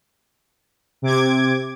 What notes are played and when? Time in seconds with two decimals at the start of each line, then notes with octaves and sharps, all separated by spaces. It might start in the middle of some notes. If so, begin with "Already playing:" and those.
1.02 C3 D6 G#6